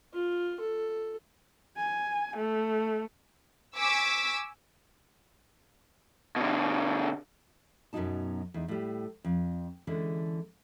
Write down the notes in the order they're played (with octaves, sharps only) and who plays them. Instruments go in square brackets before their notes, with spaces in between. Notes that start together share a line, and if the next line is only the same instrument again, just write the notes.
[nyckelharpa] F4
A4
[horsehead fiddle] G#5
A3
[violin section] G#5 C#6 D6 E6 B6
[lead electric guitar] B2 D3
[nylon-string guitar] F#2 B2 E3 F#3 D#4 A5
E2 D#4
A2 G3
F2
D3 E3 G#3 C#4 D4